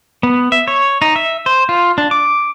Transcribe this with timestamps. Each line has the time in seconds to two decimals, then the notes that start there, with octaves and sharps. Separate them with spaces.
0.23 B3
0.52 E5
0.68 C#5
1.02 D#4
1.16 E5
1.46 C5
1.69 F4
1.98 D4
2.11 D6